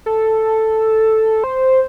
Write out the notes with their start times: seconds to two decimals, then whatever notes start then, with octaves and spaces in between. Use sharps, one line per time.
0.06 A4
1.44 C5